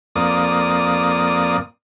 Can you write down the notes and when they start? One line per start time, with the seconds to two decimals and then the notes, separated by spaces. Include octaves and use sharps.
0.16 F2 A#3 D5 D#6